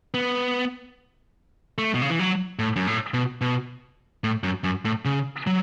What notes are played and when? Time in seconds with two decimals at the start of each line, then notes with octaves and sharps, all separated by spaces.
0.14 B3
1.78 A3
1.94 B2
2.02 C#3
2.10 E3
2.19 F#3
2.59 A2
2.76 F#2
2.87 A2
3.14 B2
3.41 B2
4.24 A2
4.44 F#2
4.64 F#2
4.85 A2
5.05 C#3
5.47 F#3